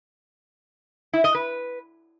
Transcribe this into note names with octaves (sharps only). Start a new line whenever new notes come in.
E4
D#5
B4